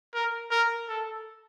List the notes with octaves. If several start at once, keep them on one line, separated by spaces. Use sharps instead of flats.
A#4
A#4
A4